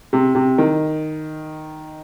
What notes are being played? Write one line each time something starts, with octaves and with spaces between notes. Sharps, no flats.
C3
C3
D#3